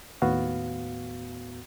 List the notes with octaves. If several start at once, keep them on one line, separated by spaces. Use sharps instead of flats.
D#2 A2 B3 F#4 F5